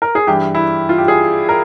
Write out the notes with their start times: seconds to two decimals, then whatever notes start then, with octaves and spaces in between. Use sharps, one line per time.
0.02 A#4
0.15 G#4
0.27 G2 E3 G4
0.55 E4
0.89 F4
0.98 G4
1.08 G#4
1.49 A#4